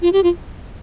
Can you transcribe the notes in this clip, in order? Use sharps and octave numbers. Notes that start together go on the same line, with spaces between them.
F4
G4
F4